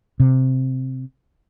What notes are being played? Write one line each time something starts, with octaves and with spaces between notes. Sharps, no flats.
C3